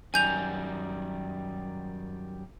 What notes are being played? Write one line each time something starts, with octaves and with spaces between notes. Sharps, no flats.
F#2 D#3 G3 G#5 G6 F7